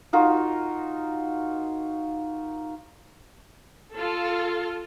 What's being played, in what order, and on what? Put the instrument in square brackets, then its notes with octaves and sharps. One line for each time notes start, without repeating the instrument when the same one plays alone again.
[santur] D#4 F4 F#4 A#4
[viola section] F4 A4